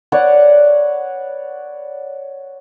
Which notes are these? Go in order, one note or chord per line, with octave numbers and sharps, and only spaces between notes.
B4 C#5 D5 F#5